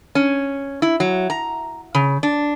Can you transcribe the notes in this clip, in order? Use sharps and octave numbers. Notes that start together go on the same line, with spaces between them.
C#4
E4
F#3
A#5
C#3
D4